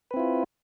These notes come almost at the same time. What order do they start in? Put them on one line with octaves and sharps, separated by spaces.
B4 C4 E4 F4